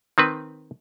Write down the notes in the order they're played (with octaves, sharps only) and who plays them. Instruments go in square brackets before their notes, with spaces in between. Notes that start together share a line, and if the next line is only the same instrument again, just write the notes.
[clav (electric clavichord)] D#3 C4 B4